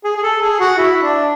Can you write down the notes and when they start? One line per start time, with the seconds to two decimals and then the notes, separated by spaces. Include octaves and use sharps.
0.04 G#4
0.17 G#4
0.23 A4
0.41 G#4
0.60 F#4
0.78 E4
1.03 D4